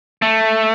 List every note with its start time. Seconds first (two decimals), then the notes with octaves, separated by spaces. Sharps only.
0.22 A3